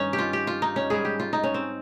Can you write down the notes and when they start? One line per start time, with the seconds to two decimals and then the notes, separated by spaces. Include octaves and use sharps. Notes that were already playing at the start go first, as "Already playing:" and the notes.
Already playing: G2 D#3 C#4 D#4
0.13 G4
0.18 F4
0.33 G4
0.47 F4
0.62 D#4
0.76 C#4
0.90 G#2 G3 G#4
1.05 G4
1.20 F4
1.33 D#4
1.44 C#4
1.54 C4